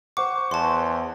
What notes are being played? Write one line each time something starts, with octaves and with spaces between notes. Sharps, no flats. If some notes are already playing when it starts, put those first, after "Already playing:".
C5 F#5 C#6 D6
E2 A5 C6